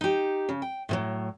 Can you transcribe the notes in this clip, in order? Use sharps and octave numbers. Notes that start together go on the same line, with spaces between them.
D#4 G4
C#3
G5
A2 F3 F#3